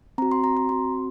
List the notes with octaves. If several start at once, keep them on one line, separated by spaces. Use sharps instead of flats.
C4 F#4 A#5
C6
A#5
A#5
C4 F#4 C6